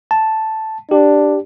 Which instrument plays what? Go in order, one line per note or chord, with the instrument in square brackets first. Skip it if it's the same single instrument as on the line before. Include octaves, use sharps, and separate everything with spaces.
[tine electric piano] A5
[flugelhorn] D4 [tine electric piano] G4